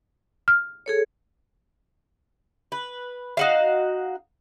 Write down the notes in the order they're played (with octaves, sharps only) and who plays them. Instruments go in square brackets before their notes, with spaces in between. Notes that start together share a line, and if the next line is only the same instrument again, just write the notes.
[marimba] F6
[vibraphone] G#4 A4 C#5
[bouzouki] B4
D#4 F#4 F5